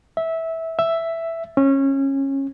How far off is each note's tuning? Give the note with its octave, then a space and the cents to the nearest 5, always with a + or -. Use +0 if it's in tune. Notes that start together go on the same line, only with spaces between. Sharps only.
E5 -15
E5 +5
C#4 -20